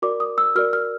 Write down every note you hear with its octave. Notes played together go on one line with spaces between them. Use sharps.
F#4 A#4 D5 D6
D#6
E6
F#4 A#4 D5 F6
F6